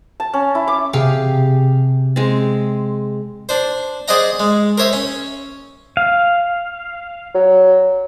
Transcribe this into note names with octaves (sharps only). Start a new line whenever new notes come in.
A5
C#4
E4
D6
C3 G4 G#4 F5
G#3 C4
D4 C5
G#4 C5 D5 D#5 F#5 A#5
G#3
A#4 C5 C#5 E5
C#4
F5
F#3